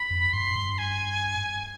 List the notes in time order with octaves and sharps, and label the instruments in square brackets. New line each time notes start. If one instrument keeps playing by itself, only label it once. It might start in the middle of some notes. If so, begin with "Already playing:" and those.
Already playing: [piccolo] B5
[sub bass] F2
[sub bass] G2 [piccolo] C6
[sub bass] G2
[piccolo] G#5